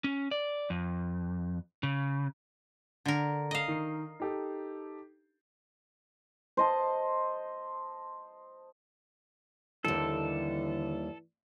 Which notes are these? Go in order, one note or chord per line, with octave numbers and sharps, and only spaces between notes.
C#4
D5
F2
C#3
D3 A#4
D#5 F5
D#3 C7
D#4 G4 A4
C5 D#5 A5
D#2 D3 E3 G3 A4